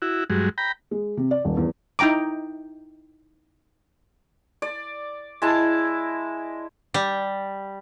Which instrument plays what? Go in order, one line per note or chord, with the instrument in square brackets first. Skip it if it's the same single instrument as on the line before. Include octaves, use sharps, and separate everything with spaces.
[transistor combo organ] E4 F#4
G2 F#3 G#3
G5 A#5 B5
[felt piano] G#3
C3
D5
D#1
E2
[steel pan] D#4 E4 G5 A#5 D6
[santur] D5
G#3 E4 A5
[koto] G3